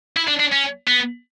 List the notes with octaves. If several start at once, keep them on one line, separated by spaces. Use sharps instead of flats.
E4
D4
D4
C#4
B3